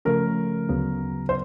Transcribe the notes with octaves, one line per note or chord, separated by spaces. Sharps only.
C#3 F3 A3 C#4 A#4
D2 C#3 F#3 B3
C5